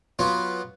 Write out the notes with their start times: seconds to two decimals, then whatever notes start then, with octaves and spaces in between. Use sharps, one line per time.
0.19 F#3 B3 F4